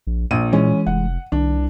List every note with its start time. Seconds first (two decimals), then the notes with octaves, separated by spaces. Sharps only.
0.07 A#1
0.31 A#1 A#2 D#7
0.53 E3 G#3 C#4
0.87 F1 F#5
1.32 C2 D#3 D4